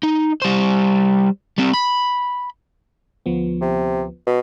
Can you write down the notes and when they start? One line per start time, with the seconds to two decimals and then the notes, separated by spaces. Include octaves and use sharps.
0.03 D#4
0.42 G3 C5
1.58 G3 C4
1.74 B5
3.26 D2 F3 B3
3.61 C3
4.27 B2